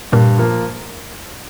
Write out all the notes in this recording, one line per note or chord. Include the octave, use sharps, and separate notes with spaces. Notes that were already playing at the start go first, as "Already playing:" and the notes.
G2 A#2
F3 A#3 F4